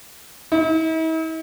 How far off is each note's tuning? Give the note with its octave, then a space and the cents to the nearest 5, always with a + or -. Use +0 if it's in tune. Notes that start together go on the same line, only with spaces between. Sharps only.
E4 -45